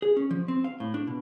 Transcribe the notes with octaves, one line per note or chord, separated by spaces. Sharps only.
G#4
C#4
F3
C4
F5
A2
D4
B2